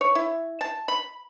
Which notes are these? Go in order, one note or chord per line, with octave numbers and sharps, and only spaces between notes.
C#5
E4
A5
B5